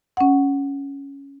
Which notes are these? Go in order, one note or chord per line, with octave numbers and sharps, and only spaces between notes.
C#4 F#5